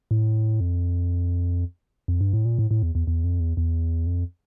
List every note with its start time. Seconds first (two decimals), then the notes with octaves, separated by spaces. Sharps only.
0.11 A2
0.60 F2
2.08 F2
2.21 G2
2.33 A2
2.45 A#2
2.59 A2
2.71 A2
2.83 E2
2.95 E2
3.07 E2
3.24 F2
3.40 E2
3.57 E2
4.06 F2